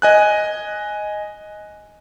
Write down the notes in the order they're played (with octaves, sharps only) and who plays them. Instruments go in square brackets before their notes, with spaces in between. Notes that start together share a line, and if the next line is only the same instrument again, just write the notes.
[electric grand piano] D#5 G#5 F#6